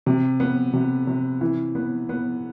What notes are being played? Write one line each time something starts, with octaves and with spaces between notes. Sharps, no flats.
C3
B3
C3
C3
E3
B3
B3